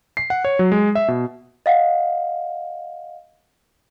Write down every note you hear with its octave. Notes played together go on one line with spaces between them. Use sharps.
C7
F#5
C#5
F#3
G#3
E5
B2
D#5 F5 F#5